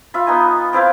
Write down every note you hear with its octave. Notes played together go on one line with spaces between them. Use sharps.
F4 E5 B5
B3 D#4 G#5
C4 E4 B4 F5